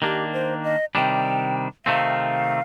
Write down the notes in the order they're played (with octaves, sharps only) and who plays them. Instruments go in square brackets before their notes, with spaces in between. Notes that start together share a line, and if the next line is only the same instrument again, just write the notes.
[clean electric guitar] D#3 A#3 D4 [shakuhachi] G4
[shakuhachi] C5
D#5
[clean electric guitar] C3 D#3 G3 D4 [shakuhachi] G5
[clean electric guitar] C3 D#3 A3 C4 [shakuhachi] F5